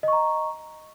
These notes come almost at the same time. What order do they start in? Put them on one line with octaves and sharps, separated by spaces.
D#5 C#6 A#5